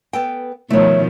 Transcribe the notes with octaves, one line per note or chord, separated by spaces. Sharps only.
B3 A4 G5
B2 D#3 F3 A3 C#5